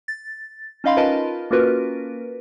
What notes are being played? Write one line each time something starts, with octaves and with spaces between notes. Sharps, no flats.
A6
C#4 D#4 D#5 F5 B5 C6
F4 A#4 B4 D#5 A5
A#3 C#4 F4 F#4 A#4 B4